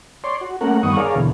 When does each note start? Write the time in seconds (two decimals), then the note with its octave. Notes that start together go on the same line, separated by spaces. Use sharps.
0.24 C#5 D5 C6
0.41 F#4
0.61 A3 A#3 C#4 A#4 F#5
0.83 G2 D#3 B3 F#5 C#6 D#6
0.97 G#4 A#4 C#5 D5 F5
1.15 E2 B2 D3